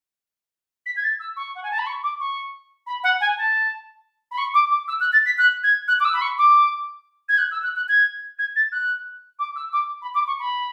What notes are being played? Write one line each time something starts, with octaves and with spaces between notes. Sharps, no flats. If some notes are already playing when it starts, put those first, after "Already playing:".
B6
G#6
A6
E6
C#6
F#5
G#5
A5
B5
C#6
D6
C#6
B5
F#5
G#5
A5
B5
C#6
D6
D6
E6
F#6
A6
B6
F#6
G#6
F#6
D6
E6
B5
C#6
D6
G#6
F#6
E6
F#6
F#6
G#6
G#6
A6
F#6
D6
E6
D6
B5
D6
C#6
B5